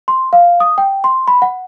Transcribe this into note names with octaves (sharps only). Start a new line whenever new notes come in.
C6
F5
D#6
G5
C6
B5
F#5